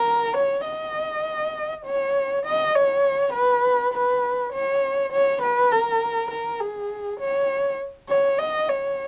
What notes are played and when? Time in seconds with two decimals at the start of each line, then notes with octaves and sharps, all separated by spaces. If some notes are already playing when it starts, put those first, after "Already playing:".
Already playing: A#4
0.37 C#5
0.67 D#5
1.85 C#5
2.45 D#5
2.75 C#5
3.34 B4
3.93 B4
4.53 C#5
5.12 C#5
5.42 B4
5.72 A#4
6.31 A#4
6.60 G#4
7.20 C#5
8.09 C#5
8.39 D#5
8.69 C#5